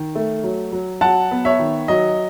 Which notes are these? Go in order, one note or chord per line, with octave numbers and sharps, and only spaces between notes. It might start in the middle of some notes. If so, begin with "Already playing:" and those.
Already playing: D#3
A3
F#3
F#3
F#3 F#5 A5
B3
C#5 E5
D#3
F#3 D#5